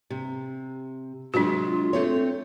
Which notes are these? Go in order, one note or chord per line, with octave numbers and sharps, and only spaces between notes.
C3
C3 F#3 G#3 D4 F4 F#4
A3 C4 C#5